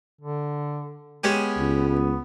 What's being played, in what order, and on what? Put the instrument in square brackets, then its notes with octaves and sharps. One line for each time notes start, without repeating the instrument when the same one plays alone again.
[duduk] D3
[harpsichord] G#3 C#4 G4 [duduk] B3
[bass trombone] C#2
[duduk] B3